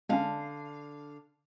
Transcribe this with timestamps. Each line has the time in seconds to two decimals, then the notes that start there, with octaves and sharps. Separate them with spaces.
0.09 D3 G#3 C4 C#4 F5